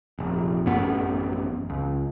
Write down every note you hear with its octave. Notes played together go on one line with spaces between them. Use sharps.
F1 A#1
A1 F#2 B3
C#2